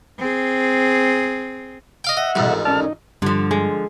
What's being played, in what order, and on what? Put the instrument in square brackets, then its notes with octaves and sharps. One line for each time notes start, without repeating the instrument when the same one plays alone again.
[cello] C4 G#4
[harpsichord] D#5 F5 G5
[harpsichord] D#5 [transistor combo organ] E5 F#5
[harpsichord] A1 F2 G#2 [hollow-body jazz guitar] B2 G3
[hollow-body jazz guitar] A#4
[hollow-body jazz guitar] C#4 A#4 D5 [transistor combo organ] A5 F6
[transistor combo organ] D#4
[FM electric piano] G2 G3 [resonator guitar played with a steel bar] D3 F3
[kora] G#3